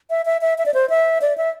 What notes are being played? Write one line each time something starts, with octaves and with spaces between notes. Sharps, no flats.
E5
E5
E5
E5
D5
C5
E5
D5
E5